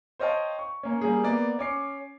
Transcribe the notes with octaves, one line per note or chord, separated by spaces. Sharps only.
C5 C#5 D#5 F5 G5 A5
C#6
A#3 C#4
G3 A#3 G#4
A#3 B3 D5
C#4 D6 C7